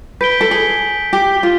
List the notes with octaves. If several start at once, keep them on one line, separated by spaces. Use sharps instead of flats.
B4 G6 B6 D7 G7
A4
G#4
G4
F4